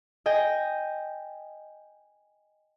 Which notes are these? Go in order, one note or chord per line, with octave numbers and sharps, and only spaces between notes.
D#5 G5 G#5